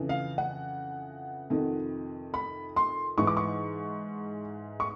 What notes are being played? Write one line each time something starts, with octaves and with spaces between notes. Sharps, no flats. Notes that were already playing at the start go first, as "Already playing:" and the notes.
Already playing: F2 C#3 E3
F5
F#5
F2 C3 D#3
B5
C6
G#2 E3 C#6
D6
C#6
C#6